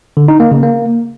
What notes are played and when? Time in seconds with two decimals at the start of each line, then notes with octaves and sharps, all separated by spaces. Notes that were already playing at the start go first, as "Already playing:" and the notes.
0.17 D3
0.28 D#4
0.40 A#3
0.51 C#3
0.63 A#3